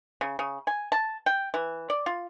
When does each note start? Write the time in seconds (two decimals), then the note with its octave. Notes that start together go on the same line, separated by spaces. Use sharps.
0.21 C#3
0.39 C#3
0.67 G#5
0.92 A5
1.26 G5
1.54 E3
1.90 D5
2.06 F4